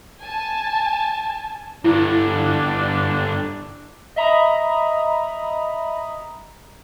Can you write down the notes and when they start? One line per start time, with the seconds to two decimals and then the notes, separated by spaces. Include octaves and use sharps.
0.20 G#5 A5
1.84 G2 D3 D4 E4
4.16 D#5 E5 A#5 B5 D#6